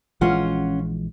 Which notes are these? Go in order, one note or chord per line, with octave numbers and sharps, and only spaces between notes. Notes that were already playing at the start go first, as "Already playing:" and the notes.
A#1 E3 G#3 C#4 F4 F#5